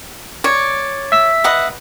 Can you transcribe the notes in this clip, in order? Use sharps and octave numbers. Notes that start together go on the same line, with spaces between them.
C#5 D5
E5 E6 B6
B4 D#5 F#5